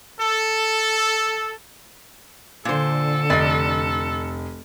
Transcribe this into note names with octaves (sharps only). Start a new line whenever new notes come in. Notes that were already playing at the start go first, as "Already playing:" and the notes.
A4
A#2 D3 A4 C5
F1 D5 D#5